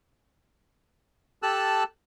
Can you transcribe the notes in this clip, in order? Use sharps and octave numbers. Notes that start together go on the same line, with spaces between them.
G4 A4 A5 E6 F#6